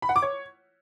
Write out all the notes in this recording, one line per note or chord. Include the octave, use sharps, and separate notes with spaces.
B5
F#5
D6
C#5